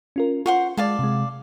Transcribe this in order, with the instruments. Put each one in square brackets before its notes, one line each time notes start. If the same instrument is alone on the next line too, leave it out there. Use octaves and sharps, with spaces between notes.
[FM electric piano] C#4 F4 A#4
[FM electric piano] F4 [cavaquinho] C5 F#5 C#6
[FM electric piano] G#3 [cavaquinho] D5 F5 A5
[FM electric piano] C3 G#3